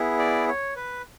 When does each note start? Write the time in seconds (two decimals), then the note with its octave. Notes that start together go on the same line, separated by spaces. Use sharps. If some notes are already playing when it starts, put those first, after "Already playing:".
Already playing: B3 E4 G#4
0.19 D5
0.48 C#5
0.76 B4